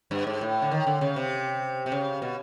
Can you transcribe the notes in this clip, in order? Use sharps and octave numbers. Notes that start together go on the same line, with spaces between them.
G2
G#2
A2
D3
D#3
D3
C#3
C3
C3
C#3
B2